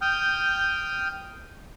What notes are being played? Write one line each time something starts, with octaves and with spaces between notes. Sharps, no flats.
G5 D#6 F6 G6